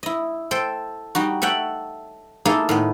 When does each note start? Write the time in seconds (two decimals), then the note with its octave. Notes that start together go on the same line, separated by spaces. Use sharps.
0.03 E4 D#5
0.51 A4 C5 G5
1.15 G3 D#4 F#4
1.42 A4 C#5 E5 F#5 G5
2.45 A#3 D#4 E4 G#4 A4
2.69 A2 D#3 B3